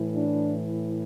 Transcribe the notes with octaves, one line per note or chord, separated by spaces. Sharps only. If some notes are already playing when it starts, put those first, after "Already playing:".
Already playing: A2 E3
D4